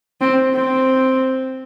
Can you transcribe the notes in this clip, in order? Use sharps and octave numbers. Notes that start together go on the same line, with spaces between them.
C4
C4